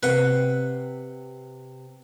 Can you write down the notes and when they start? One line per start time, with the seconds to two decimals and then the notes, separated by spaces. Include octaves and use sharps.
0.03 C3 B4 F#5